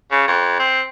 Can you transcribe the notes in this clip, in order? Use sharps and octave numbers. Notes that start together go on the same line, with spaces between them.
C#3
F2
C4